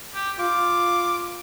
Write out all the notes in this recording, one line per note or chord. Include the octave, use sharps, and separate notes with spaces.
G4
F4 D6